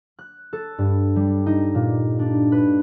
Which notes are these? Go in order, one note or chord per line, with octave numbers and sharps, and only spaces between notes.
F#6
A4
G2
G3
D#4
A#2
D4
B4